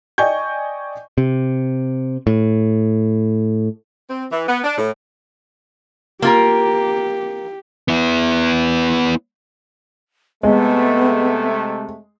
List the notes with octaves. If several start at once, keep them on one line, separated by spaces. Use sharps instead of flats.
D5 D#5 G5 G#5 C#6 G6
C3
A2
C4
E3
B3
D4
A2
A#3 F4 G4 A#4
B3 E4
C3 G#3 A3 B3